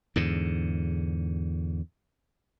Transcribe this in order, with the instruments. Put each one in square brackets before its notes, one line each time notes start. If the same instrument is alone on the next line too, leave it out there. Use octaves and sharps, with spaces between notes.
[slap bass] E2 G#2 D3